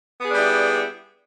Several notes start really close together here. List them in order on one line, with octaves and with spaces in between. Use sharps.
B3 G#4 D4 G3 E4